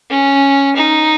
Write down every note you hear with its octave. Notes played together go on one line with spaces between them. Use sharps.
C#4
D#4